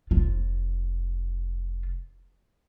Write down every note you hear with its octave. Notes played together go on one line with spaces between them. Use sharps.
F1 F4